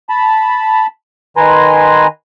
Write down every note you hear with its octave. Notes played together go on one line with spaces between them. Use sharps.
A5 B5
D#3 B4 G#5 A#5 C6